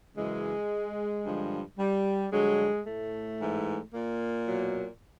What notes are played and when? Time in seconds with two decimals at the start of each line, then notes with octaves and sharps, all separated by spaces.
0.16 F#2 C#3 E3 G#3
1.23 G2 D3 F3
1.78 G3
2.31 G2 D3 F#3 G#3
2.85 A2 A3
3.40 G#2 E3
3.93 A#2 A#3
4.47 B2 F#3